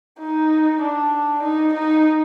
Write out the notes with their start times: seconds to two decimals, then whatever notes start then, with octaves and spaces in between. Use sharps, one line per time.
0.20 D#4
0.82 D4
1.43 D#4
1.74 D#4